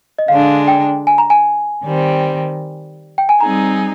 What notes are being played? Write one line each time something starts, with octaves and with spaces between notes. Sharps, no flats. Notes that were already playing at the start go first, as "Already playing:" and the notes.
D#5
D3 G#3 D4 F5
G5
G#5
A#5
G#5
D#3 G3 C4
G5
G#5
G3 C4 D#4 G#4 A#5